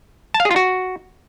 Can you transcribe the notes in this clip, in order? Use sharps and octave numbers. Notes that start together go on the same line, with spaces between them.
A5
F5
G#4
F4
F#4